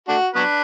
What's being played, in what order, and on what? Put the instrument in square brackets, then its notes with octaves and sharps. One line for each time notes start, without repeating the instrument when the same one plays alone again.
[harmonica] A3 D4 F#4
[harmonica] F#3 B3 D4 [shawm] B4